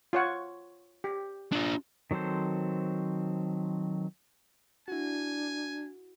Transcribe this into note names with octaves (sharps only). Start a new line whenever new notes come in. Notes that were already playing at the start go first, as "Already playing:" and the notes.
F4 C#5 F#5
G4
D4 F4
D#3 F#3 C4 A4 C5
D4 E4 F#4 G#5